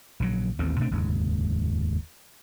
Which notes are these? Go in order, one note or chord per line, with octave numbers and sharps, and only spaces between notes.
A#1 C#3 F#3
A1 D#2 A3 C4
B2 A3 C4 D4
F1 D#2 G#2 C#3